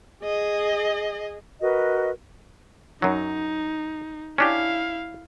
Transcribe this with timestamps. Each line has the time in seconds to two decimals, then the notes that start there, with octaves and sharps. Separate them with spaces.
0.24 G#4 D#5
1.61 F#4 A#4 B4 D#5
3.02 F#2 F#3 D#4
4.38 C#4 D4 E4 G4 F5